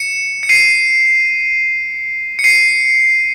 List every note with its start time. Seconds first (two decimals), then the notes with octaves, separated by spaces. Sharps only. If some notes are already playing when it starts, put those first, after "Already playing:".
Already playing: C#7 E7
0.43 C#7
0.49 C7 D#7
2.39 C#7
2.44 C7 D#7